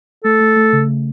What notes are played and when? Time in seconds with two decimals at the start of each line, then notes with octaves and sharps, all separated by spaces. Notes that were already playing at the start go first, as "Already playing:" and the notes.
0.24 A3 A4
0.40 A3
0.56 A3
0.73 C#3
0.88 C#3